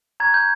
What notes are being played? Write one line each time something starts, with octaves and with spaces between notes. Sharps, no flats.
A#5 C#6 F#6 G#6
G6